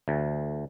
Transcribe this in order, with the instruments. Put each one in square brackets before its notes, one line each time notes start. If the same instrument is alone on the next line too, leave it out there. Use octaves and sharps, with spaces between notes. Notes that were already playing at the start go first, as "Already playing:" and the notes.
[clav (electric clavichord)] D2